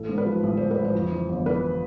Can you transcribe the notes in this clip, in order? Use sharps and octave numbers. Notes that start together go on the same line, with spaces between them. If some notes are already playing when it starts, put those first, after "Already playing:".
Already playing: A1 A4
G#2
B4
F3
A1
A1 C5
B4
A1
C5
F2
E3
G1
E3 B4